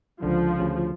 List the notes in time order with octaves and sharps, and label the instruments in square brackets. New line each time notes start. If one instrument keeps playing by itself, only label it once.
[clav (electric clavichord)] C#2 D3 [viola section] F3
[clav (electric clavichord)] D2 C#3